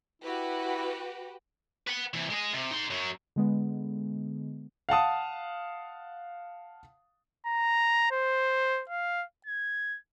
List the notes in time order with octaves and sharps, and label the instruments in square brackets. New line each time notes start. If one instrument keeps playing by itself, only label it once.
[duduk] E4 [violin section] F#4 G4 B4
[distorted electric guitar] B4 F#5
C3 E3
G#3 D#5
C3
D#4 C6
F#2 F#3
[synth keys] D3 G#3 B3
[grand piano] F5 F#5 A5 D#6
[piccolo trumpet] A#5
C5
F5
G#6